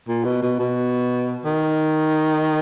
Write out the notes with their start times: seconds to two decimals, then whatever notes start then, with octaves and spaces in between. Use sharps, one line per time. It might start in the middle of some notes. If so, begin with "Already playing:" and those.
0.08 A#2
0.24 B2
0.42 B2
0.59 B2
1.45 D#3